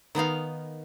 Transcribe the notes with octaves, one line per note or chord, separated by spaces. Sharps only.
D#3 B3 D#4 F5